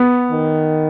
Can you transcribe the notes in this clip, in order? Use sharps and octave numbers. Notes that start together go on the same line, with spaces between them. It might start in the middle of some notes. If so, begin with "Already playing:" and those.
Already playing: B3
D#3